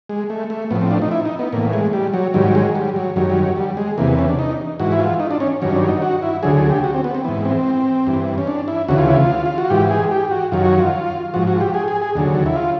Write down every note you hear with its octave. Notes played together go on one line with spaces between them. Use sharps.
G#3
A3
A3
A2 F3 B3
C4
D4
D#4
E4
D#4
B3
A2 E3 A#3
G#3
G3
F#3
G#2 D#3 F#3 G3
G#3
G3
F#3
F#2 D#3 F#3 G3
G3
F#3
G3
G#3
E2 C3 E3 A#3
B3
C#4
D4
D#4
G#2 E3 F#4
E4
F4
D#4
D4
C#4
G2 D#3 F#3 C#4
D4
D#4
F#4
E4
D2 D3 F#3 G#4
G#4
G4
F#4
C4
B3
C4
G#2 E3 B3
C4
G2 E3
C#4
D4
E4
D2 C#3 E3 F#4
F4
E4
F4
F4
F#4
G#2 E3 G4
G#4
G4
F#4
F#2 D#3 F#3 F4
F#4
F4
G#2 F3 F#4
F#4
G4
G#4
G#4
G#4
D#2 D3 F#3
E4
F4